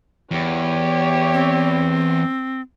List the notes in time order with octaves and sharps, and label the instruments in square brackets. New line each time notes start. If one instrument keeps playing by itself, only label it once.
[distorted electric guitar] E2 [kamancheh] G4 C#5
[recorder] C4